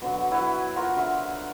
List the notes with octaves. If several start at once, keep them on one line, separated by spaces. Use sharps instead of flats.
B2 D3 F#3
F#3 E4 B4 B5
F4 F#4 A#4 B4
D3 C#5 E5